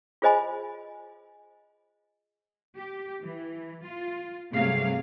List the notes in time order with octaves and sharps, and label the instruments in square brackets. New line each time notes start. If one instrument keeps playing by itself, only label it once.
[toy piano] F4 G#4 C5 D#5 G#5 B5
[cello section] G4
E3
F4
G2 C3 F#3 A3 G#4 F5